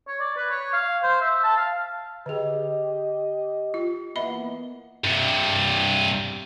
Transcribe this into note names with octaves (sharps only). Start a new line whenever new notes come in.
C#5
D5
B4
C#5
F5
C5
E5
A5
F5
D3 G4 G#4 D#5
F4
E3 A#3 B3 D#5 E5 B5
G2 C3